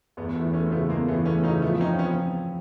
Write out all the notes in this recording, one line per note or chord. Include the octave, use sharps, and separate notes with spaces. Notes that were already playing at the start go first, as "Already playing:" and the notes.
E2 A3 B3
E3 A3 B3
A3 B3 C#4
C4
C#3 A3 B3
E2 G#3 A#3
E3 A3 B3
A3 B3 C#4
C#3 C#4 D#4
F3 A3 B3
C4 C#4 D#4
F3 B3 C#4